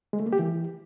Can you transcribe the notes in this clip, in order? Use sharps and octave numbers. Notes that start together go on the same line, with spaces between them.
G#3
A3
A#3
G4
E3